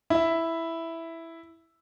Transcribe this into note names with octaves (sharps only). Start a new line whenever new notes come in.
E4 E5